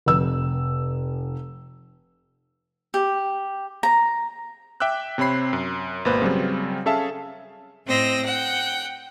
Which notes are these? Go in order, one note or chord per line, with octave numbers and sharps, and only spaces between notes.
F1 E6
G4
A#5
E5 G5 D6 E6 F#6
C3 C4 C#5 B5 C7
F#2
G#1 B2 A#3 B4 C5
C#3 F#3 G3 C4
C#4 G#4 A4 E5 F5 A5
A2 C4 D#5 E6 A#6
F#5 G5